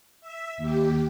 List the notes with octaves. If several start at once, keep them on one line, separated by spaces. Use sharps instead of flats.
E5
D#2 G4